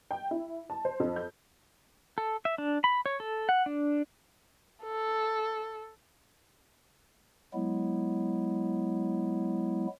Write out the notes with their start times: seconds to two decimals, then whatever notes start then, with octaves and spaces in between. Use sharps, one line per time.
0.11 G5
0.31 E4
0.70 A5
0.85 C5
1.00 F2
1.16 G6
2.18 A4
2.45 E5
2.58 D4
2.84 B5
3.06 C#5
3.20 A4
3.49 F#5
3.66 D4
4.83 A4
7.54 F#3 G#3 B3 E4